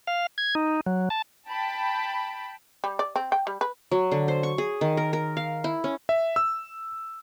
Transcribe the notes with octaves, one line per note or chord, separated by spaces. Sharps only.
F5
G#6
D#4
F#3
A5
G5 A5 B5
G3
D5
C4
G5
G3
B4
F#3
D3
C5
C#6
G#4
D#3
A#4
A#4
F5
E4
C#4
E5
E6